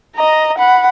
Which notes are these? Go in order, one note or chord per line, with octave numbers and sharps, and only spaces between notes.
D#5 A#5
F#5 B5